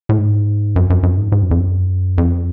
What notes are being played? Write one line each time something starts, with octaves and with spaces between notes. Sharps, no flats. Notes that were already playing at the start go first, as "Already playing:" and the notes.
A2
G#2
F#2
F#2
F#2
G#2
G#2
F#2
F2
F#2
F2